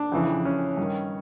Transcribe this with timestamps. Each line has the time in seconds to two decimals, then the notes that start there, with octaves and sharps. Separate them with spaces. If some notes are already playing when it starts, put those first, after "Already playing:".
Already playing: D4
0.12 F2 C#3 E3
0.45 C#4
0.77 G2 D#3